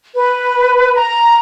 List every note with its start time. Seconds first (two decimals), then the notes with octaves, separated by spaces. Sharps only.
0.16 B4
0.96 A#5